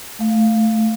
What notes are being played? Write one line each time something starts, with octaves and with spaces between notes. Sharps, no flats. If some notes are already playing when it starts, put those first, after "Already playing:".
A3 F5